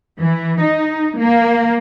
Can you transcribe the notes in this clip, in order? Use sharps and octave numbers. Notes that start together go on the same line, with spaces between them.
E3
D#4
A#3